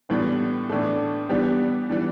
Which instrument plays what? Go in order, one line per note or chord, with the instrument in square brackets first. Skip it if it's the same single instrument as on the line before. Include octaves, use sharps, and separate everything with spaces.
[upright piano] A2 E3 G3 D4 [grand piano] B3
[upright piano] A2 E3 A3 [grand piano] D4
[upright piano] E3 G3 D4 G4 [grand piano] B3
[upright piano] E3 G3 D4